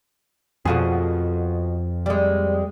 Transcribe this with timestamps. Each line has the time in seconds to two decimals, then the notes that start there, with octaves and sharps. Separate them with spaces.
0.65 F2 B2 F3 F#4 G#4
2.06 G3 G#3